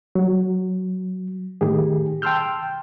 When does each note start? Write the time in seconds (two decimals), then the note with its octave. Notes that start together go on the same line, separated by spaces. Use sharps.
0.15 F#3
1.61 A2 D#3 G4 G#4
2.22 G5 A5 C6 E6 F6 G6